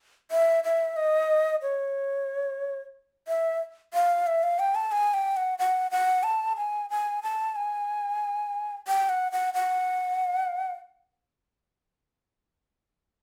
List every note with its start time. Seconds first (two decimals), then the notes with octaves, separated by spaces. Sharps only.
0.31 E5
0.64 E5
0.96 D#5
1.62 C#5
3.28 E5
3.94 F5
4.27 E5
4.43 F5
4.59 G5
4.75 A5
4.92 G#5
5.14 G5
5.37 F#5
5.59 F#5
5.91 F#5
6.23 A5
6.57 G#5
6.90 G#5
7.23 A5
7.56 G#5
8.88 G5
9.09 F#5
9.32 F#5
9.54 F#5